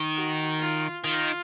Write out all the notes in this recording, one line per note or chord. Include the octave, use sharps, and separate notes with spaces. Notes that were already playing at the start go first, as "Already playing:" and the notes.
Already playing: D#3
F#4
F4
D#3 F4